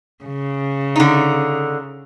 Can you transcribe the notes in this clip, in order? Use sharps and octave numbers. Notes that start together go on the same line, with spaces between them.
C#3
D3 D#4